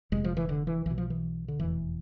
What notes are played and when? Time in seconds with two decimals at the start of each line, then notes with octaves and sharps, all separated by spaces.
0.12 F1 F2 C3 G#3
0.24 F3
0.37 E3
0.49 D3
0.67 E3
0.86 B1 B2 E3
0.98 F3
1.10 E3
1.48 D3
1.59 F1 E2 B2 E3